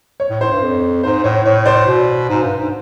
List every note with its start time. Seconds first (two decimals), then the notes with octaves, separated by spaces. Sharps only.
0.20 C#5
0.30 A2
0.41 A2 C5
0.51 G2
0.62 F2
1.03 G#2 C5
1.24 A2 C#5
1.44 A2 C#5
1.65 C5 D5
1.87 B2
2.29 G#2
2.43 G2
2.57 G#2